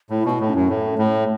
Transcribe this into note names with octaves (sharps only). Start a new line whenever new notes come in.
A2 E4
B2 E4
A2
C#4
F#2
A2 A3
A2